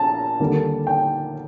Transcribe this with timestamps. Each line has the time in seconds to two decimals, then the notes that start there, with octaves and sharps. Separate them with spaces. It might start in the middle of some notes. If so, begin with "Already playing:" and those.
Already playing: A#1 A#2 A5 A#5
0.40 D#2 D3 G3 A#3
0.87 G5